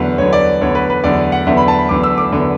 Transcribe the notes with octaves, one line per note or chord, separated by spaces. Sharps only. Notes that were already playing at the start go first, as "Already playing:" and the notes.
Already playing: E2 D3 F#3 B4
E2 D3 F#3 C#5
D5
E2 D3 F#3 C#5
B4
B4
E2 D3 F#3 D5
F#5
E2 D3 F#3 E5
B5
A5
B5
E2 D3 F#3 D6
E6
D6
E2 D3 F#3